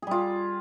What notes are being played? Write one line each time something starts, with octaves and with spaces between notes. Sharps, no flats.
G3 F4 G#4